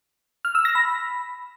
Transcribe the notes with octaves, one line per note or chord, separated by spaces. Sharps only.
F6
E6
A#6
B5